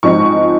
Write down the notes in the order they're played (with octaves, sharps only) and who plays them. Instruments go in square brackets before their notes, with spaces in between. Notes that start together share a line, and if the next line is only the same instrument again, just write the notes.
[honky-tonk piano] G#2 F3 C4 D#4 C#6